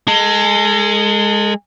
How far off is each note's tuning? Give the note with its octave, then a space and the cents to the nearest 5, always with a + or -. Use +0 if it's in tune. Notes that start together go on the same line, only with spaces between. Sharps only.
G#3 +0 A4 +40